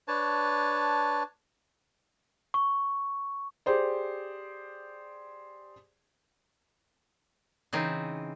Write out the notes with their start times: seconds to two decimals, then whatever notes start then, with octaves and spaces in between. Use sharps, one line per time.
0.08 D4 B4 C#5 A5
2.54 C#6
3.66 G4 G#4 C5 D5
7.73 C#3 E3 C4 D#4